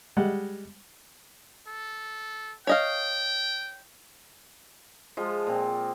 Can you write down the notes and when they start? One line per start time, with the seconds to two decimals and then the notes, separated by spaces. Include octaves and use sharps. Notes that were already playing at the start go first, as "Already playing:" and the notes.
0.17 G3 G#3 F#5
1.68 A4
2.67 C#5 D#5 F5 G5
5.17 F3 G#3
5.47 A#2 C4